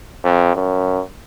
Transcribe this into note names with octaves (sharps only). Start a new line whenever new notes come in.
F2
F#2